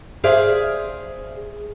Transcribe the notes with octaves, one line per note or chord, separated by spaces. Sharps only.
G#4 C5 D5 E5 F5